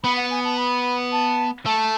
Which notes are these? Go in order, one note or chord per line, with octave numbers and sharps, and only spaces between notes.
B3 B5
F#5
G#5
A5
B5
A5
A3 A5